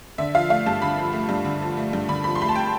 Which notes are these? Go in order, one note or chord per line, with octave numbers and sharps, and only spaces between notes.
D3 E5
F3 F5
A3 F5
G2 A5
D3 B5
F3
A3
G2
D3
F3
A3
G2
D3 B5
F3 B5
C6
A3 B5
A5
G5